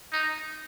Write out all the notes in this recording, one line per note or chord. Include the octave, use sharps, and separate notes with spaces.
D#4